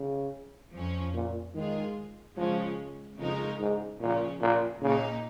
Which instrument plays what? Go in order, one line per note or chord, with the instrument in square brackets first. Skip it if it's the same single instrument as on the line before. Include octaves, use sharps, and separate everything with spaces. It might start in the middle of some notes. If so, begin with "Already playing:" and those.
Already playing: [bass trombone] C#3
[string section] F2 F3 C#4
[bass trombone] A#2
[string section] G#2 G#3 F4 G#4 [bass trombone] D#3
[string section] C#3 G#3 C#4 [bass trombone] F3
[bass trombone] F2 [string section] C#3 G#3 D#4 A#4
[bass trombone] G#2
[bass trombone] A#2 [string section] C#3 F3 C#4
[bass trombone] A#2
[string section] A#2 A#3 D#4 [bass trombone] C#3